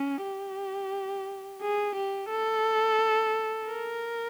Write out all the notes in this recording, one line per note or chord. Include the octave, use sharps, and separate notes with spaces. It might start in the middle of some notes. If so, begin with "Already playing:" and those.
Already playing: C#4
G4
G#4
G4
A4
A#4